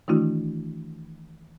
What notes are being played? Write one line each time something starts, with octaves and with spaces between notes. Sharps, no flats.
D#3 E3 A3 D4 E4 F#4